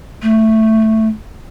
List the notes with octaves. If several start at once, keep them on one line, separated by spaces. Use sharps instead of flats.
A3